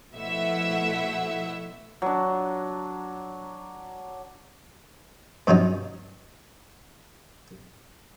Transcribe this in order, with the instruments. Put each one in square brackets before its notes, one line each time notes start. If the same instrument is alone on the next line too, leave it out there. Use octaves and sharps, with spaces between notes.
[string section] B2 F3 A3 E4 E5 F#5
[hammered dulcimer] F#3 D4
[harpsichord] G2 C#3 F3 F#3 D#4